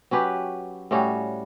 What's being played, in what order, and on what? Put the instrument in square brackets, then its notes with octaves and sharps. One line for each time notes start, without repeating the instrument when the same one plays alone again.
[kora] F#3 C#4 G4 B4
A2 G3 C#4 F#4